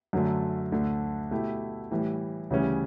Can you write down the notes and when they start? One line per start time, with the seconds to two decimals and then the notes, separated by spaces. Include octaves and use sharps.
0.13 F#2 D3 F#3 A3
0.72 D2 D3 A3
1.31 B2 A3 E4 G4
1.91 A2 E3 G3
2.50 D2 C#3 E3 G3 C#4